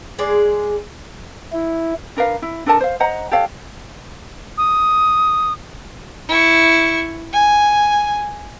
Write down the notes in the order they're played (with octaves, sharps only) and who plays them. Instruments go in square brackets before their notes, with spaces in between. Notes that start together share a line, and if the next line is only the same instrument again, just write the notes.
[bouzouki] G#3 G#4 D5
[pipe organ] E4
[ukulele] D4 A#4 B4 F5
E4
D4 A4 A#4 A5
C5 F5
C5 D#5 F#5 A#5
G4 A4 C#5 F5
[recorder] D#6
[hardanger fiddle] E4 C#6
G#5